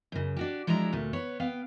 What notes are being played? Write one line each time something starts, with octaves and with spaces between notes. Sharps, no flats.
F#2 C#3
D4 F#4 G4
F3 G#3 D4 E4 A#5
D2 A#2 A3
B3 C#5
B3 F5 G5